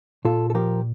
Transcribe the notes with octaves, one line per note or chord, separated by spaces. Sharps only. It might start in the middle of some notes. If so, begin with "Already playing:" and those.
A#2 F4 A4
A4
F3 G4 A#4